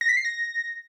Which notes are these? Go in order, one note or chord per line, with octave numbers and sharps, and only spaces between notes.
A#6
B6
C7
A#6